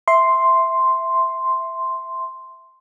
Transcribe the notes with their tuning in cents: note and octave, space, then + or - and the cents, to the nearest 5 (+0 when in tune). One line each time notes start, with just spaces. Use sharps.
E5 +0 C6 +0